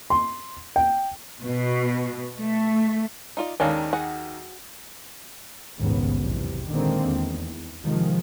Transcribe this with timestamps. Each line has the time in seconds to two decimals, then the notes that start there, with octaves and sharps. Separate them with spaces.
0.10 C6
0.76 G5
1.41 B2
2.39 A3
3.37 D#4 F4 D5
3.60 D#2 D#3 G#3 C#4 D4 F5
3.93 F#4 G#4 F#5
5.79 A#1 D#2 G#2 C#3 B3
6.18 B1 E2 C3
6.69 A#2 D3 D#3 G#3 A#3 C4
7.05 E2
7.83 C3 D#3 F3 G#3